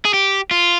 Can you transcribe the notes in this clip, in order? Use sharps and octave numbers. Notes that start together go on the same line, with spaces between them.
G#4
G4
F4